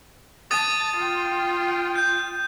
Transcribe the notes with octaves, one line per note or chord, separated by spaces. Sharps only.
A5 D#6 A6 D#7
F4 G5
G6